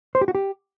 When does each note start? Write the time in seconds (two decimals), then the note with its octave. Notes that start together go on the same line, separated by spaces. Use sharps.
0.15 C5
0.21 G4
0.28 F#4
0.35 G4